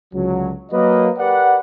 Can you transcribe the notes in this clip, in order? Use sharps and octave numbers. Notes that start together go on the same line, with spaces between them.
C#2 D3 F#3
F#3 A#3 B4 D#5
G4 A#4 B4 D5 F#5